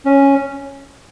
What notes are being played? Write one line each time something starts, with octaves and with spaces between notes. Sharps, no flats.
C#4